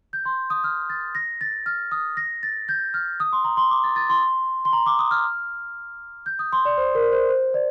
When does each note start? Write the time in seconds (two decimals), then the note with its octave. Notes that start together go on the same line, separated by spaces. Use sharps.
0.13 G6
0.25 C6
0.50 D#6
0.64 F6
0.90 A6
1.15 A#6
1.41 A6
1.66 F6
1.92 D#6
2.17 A#6
2.43 A6
2.69 G6
2.94 F6
3.20 D#6
3.33 C6
3.44 A#5
3.57 C6
3.70 D6
3.84 A6
3.96 A6
4.10 C6
4.65 C6
4.73 A#5
4.86 D6
4.99 D#6
5.11 F6
6.26 G6
6.39 D#6
6.52 C6
6.65 D5
6.78 C5
6.95 A#4
7.12 C5
7.29 C5
7.54 D5